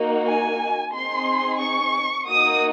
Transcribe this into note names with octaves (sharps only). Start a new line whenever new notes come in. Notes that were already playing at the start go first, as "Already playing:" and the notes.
Already playing: A#3 D#4 F#4
G#5
C4 D#4 G#4 C6
C#6
A#3 D#4 F#4 D#6